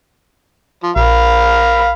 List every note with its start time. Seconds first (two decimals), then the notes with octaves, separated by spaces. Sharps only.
0.83 F3
0.96 A#1 A#4 F5 B5